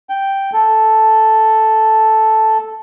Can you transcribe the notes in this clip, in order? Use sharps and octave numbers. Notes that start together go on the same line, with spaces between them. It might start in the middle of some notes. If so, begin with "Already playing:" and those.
G5
A4